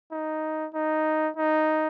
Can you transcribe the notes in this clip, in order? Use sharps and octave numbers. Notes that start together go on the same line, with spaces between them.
D#4
D#4
D#4